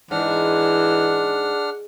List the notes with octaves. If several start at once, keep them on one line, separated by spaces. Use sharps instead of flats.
G#2 E3 D4 F#5 F6